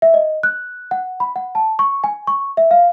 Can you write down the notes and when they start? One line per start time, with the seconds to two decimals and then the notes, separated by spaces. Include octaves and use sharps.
0.02 E5
0.14 D#5
0.43 F#6
0.91 F#5
1.20 B5
1.36 F#5
1.55 A5
1.79 C#6
2.04 G#5
2.27 C#6
2.57 E5
2.71 F5